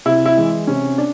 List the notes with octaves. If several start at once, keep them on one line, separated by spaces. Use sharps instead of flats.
C3 E4
E4
E3 G#3
C3 C#4
D4